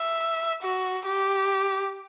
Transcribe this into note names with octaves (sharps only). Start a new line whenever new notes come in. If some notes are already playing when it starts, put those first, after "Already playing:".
Already playing: E5
F#4
G4